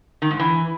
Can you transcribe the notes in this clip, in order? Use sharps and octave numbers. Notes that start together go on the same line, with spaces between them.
D#3
G#2
E3